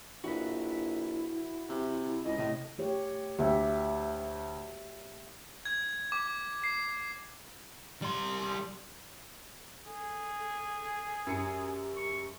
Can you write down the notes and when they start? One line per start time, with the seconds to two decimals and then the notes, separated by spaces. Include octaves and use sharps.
0.24 A#1 E4 F#4 B4
1.69 C3
2.24 C#2 D#5
2.38 A2 C3
2.78 A3 G4 C#5
3.39 D2 G4 E5
5.65 G#6
6.12 D6
6.64 C7
8.02 G3 C6
9.86 G#4 A4
11.27 F#2 G4 C#7
11.95 C#6